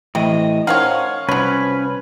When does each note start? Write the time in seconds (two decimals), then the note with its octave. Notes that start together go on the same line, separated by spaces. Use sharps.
0.15 A2 C3 E3 D#5
0.67 D#3 F3 C#4 C#5 F5 F#5
1.29 C2 F3 F#3 C#4 B4